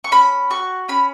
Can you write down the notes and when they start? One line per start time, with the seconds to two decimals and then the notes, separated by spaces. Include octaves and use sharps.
0.04 C#6
0.12 C#4 B5
0.50 F#4 C#6
0.88 C#4 B5